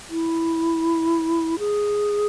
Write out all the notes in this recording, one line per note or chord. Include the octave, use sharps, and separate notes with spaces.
E4
G#4